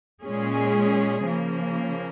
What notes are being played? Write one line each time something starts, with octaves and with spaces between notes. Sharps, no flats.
A#2 G#3 C#4 G#4
C#3 F3 A#3